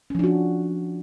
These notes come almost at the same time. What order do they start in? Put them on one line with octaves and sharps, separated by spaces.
C#4 F3 D4 F#4